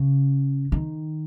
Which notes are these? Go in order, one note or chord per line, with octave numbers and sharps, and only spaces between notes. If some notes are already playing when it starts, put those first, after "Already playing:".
Already playing: C#3
D#3